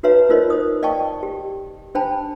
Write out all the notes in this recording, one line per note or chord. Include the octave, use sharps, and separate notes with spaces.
D#4 F#4 B4 C#5 E5 A#5
D#4 F4 A#4 C5 C#5 D#5
C5 D#6
D5 D#5 G5 A5 C#6
G4
D4 C5 G5 A5 B5